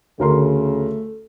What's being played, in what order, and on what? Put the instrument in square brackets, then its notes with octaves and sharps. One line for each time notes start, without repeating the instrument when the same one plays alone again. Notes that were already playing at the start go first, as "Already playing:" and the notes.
[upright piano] D2 A#4 C6 [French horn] C#3 [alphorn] A3